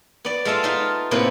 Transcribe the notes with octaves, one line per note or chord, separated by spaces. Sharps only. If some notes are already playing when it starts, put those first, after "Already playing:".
B3 D5
G#3 F4 A4 E5 F5
D#4 F4 A5
A2 C3 A#3 B3